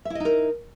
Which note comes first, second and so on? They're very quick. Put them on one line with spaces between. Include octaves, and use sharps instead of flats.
E5 E4 D#5 D#4 A#4